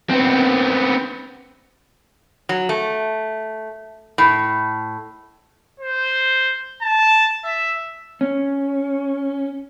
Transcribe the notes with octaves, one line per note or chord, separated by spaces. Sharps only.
B3 C4
F#3
A3
A2
C5
A5
E5
C#4